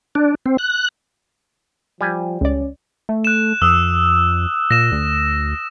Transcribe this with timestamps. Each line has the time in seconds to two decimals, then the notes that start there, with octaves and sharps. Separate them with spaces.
0.15 D4
0.46 C4
0.58 F#6
2.01 F3 G3 G#5
2.41 C#2 C#4 D5
3.09 A3
3.25 F#6 E7
3.62 F2 D#6 E6
4.71 A#2 A#6 E7
4.92 D2